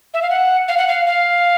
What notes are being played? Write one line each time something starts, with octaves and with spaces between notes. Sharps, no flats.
E5
F5
F#5
F5
F#5
F5
F5